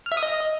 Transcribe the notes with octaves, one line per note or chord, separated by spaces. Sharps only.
F6
E5
D#6
D#5